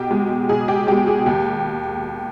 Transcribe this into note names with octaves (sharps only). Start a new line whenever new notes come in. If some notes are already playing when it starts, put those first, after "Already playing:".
Already playing: B1 G4
B2 G#3
B1 G#4
G4
B2 G#3 G4
G#4
D#2 G4